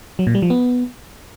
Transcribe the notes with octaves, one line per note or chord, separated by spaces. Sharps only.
F#3
A#2
G3
F3
B3